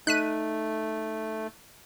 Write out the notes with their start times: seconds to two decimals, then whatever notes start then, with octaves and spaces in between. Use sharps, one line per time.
0.07 A3 D#4 F#6 B6 D#7